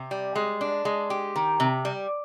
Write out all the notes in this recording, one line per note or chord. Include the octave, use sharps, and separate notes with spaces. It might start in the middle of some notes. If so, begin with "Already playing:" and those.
Already playing: C3
G3
G#3
D4
G#3
G4
D#3
C3
G3